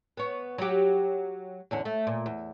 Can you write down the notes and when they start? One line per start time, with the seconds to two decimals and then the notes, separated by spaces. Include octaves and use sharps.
0.17 B3 C#5
0.58 F#3 G4
1.71 E2 D3 C#4
1.85 A3
2.07 A#2
2.26 E2